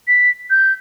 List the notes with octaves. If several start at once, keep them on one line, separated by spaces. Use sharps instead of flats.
B6
G6